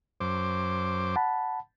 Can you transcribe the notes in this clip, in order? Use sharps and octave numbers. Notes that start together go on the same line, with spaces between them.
F#2 C5 D6
F#5 A5 B5